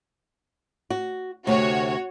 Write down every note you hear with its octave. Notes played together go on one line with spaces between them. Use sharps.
F#4
D2 C3 F#4 C#5